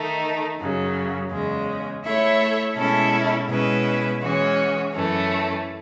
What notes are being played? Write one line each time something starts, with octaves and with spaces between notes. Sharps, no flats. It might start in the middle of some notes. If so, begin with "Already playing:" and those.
Already playing: D#3 A3 D#4
F#2 C#3 F#3
E2 C#3 G#3
A3 E4 A4 C#5 E5
B2 G#3 C#4 E4 A4
B2 G#3 C#4 E4 B4
E3 G#3 C#4 F#4
F#2 E3 A3 C#4